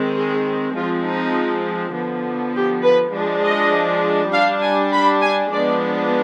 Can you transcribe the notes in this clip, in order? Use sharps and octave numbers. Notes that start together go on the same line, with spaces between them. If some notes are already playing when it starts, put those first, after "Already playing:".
Already playing: D#3 G#3 C4
G#4
F3 G#3 C4 F4
D#4
D3 F3 B3
G4
B4
F3 G#3 D4
D#5
G3 D4 F5
G#5
B5
G#5
F3 G#3 B3 D4 D5